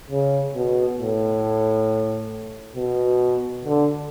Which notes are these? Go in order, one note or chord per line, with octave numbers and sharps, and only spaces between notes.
C#3
B2
A2
B2
D3